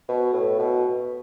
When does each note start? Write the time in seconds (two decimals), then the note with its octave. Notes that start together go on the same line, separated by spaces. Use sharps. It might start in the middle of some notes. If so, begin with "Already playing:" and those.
0.09 B2
0.33 A2
0.59 B2